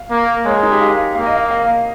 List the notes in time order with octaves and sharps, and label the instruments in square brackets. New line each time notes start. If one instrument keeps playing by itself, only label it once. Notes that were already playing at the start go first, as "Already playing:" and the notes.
Already playing: [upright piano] F5
[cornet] A#3
[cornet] G#3 [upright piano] C#5
[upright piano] A#4
D#4
G4
F5
[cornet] A#3 [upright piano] F5
[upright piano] D#5
F5
F5